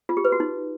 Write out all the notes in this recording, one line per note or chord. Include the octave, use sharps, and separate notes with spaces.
F4
G4
B4
F#4
D#4